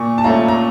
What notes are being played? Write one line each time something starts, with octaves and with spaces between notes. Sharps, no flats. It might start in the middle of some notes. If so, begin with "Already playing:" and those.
Already playing: A#2 C#6
A5
A3 C#4 F4 A#5
A#5